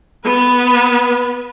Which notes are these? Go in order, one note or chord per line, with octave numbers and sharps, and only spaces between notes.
B3 B4